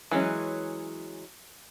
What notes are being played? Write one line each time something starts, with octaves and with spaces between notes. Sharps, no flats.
E3 F#3 G#3 C#4